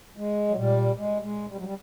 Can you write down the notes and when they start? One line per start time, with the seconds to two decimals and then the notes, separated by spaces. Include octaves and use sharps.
0.17 G#3
0.48 F#3
0.56 A#2 G3
0.96 G#3
1.22 G#3
1.49 G3
1.57 F#3
1.64 G3